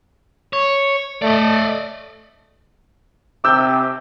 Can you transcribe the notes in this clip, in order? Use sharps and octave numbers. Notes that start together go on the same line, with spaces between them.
C#5
A3 D5 D#5
C3 D6 E6 G6